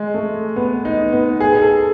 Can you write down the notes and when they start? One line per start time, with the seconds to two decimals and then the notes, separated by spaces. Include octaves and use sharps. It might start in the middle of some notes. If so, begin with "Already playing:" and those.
Already playing: G#3
0.14 A3
0.56 B3
0.85 D#4
1.13 B3
1.40 G#4
1.53 G#4
1.62 A4